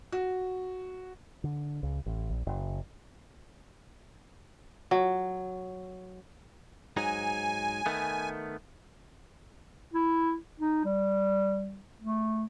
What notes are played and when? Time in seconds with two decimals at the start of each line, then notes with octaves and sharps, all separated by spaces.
0.12 F#4
1.44 D3
1.83 C#2
2.06 A1
2.30 A#1
2.47 F#1
4.91 F#3
6.97 G#2 F#3 D#4 G#5
7.86 D#3 A3 B3
9.93 E4
10.60 D#4
10.85 G3
12.00 A3